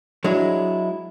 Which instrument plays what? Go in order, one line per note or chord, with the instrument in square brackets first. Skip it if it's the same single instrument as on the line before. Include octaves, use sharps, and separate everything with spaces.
[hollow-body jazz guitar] F#3 G#3 D4 E4 G#4